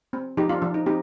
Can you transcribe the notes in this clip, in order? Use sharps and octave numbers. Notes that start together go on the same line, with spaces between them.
C4
F3 D#4 G4
D4 F4
F3 D4
D#4
C4 D#4 G4